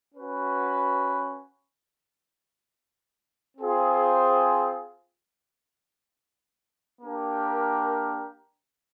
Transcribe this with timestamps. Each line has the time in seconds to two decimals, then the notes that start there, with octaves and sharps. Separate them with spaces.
0.14 C#4 F#4 B4
3.57 C4 F4 G#4 C5
7.01 A#3 D4 G4 A#4